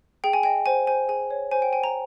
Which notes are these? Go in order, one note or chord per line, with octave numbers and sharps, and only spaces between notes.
G#4 G5
G#5
D#5 G5
C5 G#5
C5 G#5
G#4 G#5
C#5
C5 G#5
G5
G5 G#5
A#5